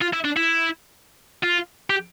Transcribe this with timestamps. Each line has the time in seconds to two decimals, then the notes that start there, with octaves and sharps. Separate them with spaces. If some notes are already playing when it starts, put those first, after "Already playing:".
0.01 F4
0.13 E4
0.24 D4
0.36 E4
1.43 F4
1.90 G4